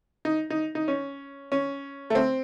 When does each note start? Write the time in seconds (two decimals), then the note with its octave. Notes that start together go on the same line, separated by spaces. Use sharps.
0.25 D#4
0.50 D#4
0.75 D#4
0.88 C#4
1.52 C#4
2.10 A3
2.15 C4